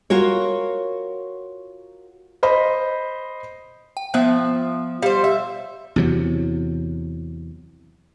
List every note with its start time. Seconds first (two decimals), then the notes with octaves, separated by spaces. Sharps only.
0.10 F4 F#4 A#4 C#5
2.43 C5 D#5 B5
3.97 G5
4.14 F3 B3 E5 F#6
5.02 G3 C5 F5
5.24 E5
5.96 E2 C3 F#3